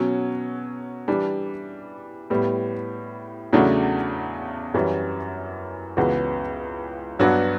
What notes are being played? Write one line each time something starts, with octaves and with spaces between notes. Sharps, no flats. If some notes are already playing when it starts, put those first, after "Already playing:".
Already playing: B2 F#3 C#4
E3 G3 D4
A2 G3 B3
E2 C#3 F#3 A3 D4
F#2 E3 G3 C#4
C#2 C#3 E3 B3 F#4
G2 F#3 B3 D4 F#4